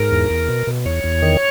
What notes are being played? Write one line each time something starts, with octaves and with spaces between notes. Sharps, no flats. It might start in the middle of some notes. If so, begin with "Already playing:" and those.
Already playing: G#2 A#4
E2
E2
B2
B2
E2 C#5
E2
D#3